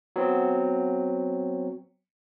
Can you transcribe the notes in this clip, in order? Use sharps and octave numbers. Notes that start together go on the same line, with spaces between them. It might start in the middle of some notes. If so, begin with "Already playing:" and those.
F#3 B3 C4